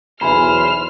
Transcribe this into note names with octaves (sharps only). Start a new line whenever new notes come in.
B1 E2 C5 E5 G#5 B5 F6